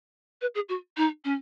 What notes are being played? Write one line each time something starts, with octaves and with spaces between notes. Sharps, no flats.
B4
G#4
F#4
D#4
C#4